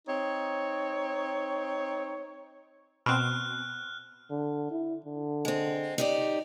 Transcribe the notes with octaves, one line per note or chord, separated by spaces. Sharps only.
C4 D#4 C#5
B2 C4 F6 F#6
D3
E4
D3
G#3 C4
D#4 G4 D5